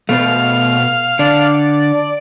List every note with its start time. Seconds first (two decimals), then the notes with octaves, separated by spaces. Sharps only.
0.09 B2 A3 B3 C5 F5
1.19 D3 D5